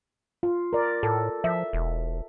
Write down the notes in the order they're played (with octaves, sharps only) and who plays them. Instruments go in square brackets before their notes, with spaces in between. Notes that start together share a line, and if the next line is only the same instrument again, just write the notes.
[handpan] F4
A#4 D5
[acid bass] A2 [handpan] A4
[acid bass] F3 [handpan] E5
[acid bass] E1